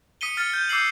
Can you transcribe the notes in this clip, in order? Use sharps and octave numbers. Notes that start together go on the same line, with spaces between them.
D#6 B6 C#7 D#7 G7
F6 A6 C#7
G6
D6 E6 G6 C7 F#7